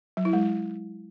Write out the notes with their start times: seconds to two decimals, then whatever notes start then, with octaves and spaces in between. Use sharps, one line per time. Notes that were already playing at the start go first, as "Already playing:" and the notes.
0.17 F#3
0.25 E4
0.33 G#3